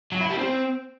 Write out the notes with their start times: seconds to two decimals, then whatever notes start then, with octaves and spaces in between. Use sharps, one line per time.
0.12 F#3
0.21 E4
0.30 G3
0.38 C4